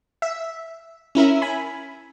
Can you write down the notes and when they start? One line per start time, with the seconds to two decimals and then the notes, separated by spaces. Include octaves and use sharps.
0.22 E5
1.15 C#4 E4 A#4 E5
1.42 G#5 B5